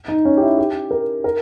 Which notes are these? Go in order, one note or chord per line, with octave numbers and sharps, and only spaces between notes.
D#4
C#4
G4
E4
G4
A#4
A#4